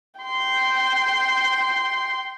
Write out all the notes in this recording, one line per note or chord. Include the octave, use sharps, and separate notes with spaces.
G5 C6